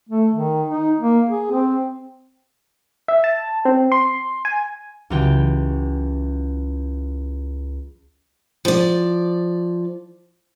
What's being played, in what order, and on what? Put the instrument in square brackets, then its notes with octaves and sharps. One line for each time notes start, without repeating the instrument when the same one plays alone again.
[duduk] A3
D#3
D#4
A#3
G#4
C4
[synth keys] E5
A5
C4
C6
G#5
[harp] C#2 E3 F#3 G4 G5
[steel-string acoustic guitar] F3 D5